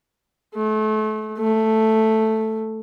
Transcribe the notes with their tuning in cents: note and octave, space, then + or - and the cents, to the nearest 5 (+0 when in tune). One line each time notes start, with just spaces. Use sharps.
A3 -30
A3 +0